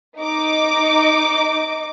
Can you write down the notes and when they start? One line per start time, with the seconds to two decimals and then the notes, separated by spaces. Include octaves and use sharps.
0.19 D#4 D6